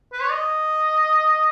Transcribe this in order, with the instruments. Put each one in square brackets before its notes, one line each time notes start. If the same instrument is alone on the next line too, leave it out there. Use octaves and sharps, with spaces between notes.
[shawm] B4
C#5
D#5